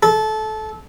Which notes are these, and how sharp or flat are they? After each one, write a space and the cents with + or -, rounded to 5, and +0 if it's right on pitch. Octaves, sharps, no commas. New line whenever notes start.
A4 -20